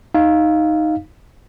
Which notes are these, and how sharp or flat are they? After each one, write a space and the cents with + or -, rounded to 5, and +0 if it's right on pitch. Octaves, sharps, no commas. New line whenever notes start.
D#4 +0 F5 +0